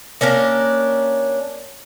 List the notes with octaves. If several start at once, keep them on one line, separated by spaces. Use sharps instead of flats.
A#3 C#4 D4 A#4